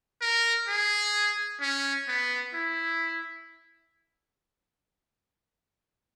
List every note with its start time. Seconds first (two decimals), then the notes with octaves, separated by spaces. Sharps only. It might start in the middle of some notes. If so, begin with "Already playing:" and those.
0.22 A#4
0.68 G#4
1.61 C#4
2.08 B3
2.54 E4